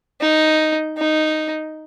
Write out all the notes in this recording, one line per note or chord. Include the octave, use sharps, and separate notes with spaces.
D#4
D#4